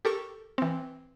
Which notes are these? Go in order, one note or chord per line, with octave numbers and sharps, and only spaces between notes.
G4 A4 A#4 C#6
E3 C4